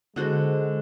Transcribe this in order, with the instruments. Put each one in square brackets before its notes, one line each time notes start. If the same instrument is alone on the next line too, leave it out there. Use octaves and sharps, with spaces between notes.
[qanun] D3 F#4 C5 [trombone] G#3